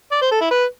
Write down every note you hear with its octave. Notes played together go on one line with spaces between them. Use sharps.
D5
C5
A4
E4
B4